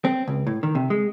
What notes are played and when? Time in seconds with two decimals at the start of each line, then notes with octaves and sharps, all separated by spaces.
0.05 C4
0.28 C#2
0.47 A2
0.63 D#3
0.75 C3
0.90 G#3